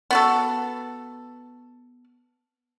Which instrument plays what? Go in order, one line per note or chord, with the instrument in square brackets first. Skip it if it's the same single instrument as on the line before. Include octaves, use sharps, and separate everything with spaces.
[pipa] B3 F#4 A4